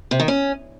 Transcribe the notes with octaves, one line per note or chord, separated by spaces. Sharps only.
C3
D#3
C#4